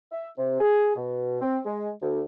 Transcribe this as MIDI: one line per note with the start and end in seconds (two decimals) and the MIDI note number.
0.12 0.28 76
0.38 0.58 48
0.60 0.93 68
0.96 1.41 47
1.42 1.58 60
1.66 1.90 56
2.02 2.21 38